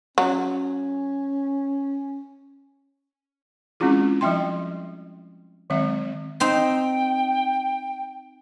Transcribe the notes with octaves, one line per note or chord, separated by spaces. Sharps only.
F#3 C#4
G#3 C4 C#4 E4 F4 G#4
F3 G3 D#5 E5 G5 C6
D#3 F#3 G#3 C4 E5
C4 D#4 G5 C6